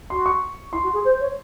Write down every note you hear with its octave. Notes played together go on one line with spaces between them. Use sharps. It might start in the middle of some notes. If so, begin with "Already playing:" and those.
F#4 C6
C#6
E4 C6
F#4
G#4
C5
C#5